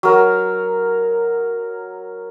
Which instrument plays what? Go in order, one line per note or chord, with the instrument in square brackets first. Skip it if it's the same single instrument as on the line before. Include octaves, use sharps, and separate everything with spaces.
[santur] F#3 A#4